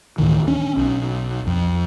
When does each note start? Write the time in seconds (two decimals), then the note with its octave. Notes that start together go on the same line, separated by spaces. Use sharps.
0.18 D2 A2 D#3 E3
0.48 C#4 D4
0.77 B1
1.47 F2